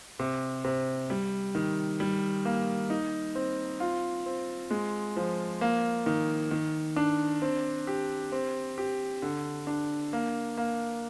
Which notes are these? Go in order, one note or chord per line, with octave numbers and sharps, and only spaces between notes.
C3
C3
G3
D#3
G3
A#3
D#4
C4
F4
C4
G#3
F3
A#3
D#3
D#3
D4
C4
G4
C4
G4
D3
D4
A#3
A#3